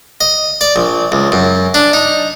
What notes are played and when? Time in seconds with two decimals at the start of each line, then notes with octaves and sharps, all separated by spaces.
0.21 D#5
0.61 D5
0.76 A#1
1.12 C#2
1.32 F#2
1.74 D4
1.93 D#4